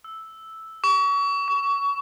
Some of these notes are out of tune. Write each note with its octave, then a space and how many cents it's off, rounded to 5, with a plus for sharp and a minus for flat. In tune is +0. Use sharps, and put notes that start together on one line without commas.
E6 -5
C#6 +35
C#6 +25